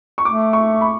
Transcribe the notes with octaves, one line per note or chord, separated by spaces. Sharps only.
C#6
A3 D6
C#6
B5